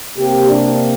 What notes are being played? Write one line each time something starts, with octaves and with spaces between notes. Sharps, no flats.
C3 A#3 G4
D4